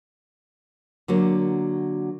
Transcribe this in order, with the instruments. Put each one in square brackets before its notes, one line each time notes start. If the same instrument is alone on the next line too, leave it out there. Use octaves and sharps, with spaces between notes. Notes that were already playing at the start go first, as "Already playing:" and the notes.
[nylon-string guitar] D3 F#3 A#3